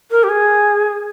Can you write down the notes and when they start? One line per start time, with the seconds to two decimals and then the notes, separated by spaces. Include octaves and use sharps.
0.11 A#4
0.23 G4
0.28 G#4